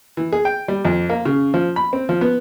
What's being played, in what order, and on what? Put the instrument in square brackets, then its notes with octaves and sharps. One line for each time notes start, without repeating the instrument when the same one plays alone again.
[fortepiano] E3
G#4
G5
G3
F2
A#3
C#3
F3
B5
C4
F3
B3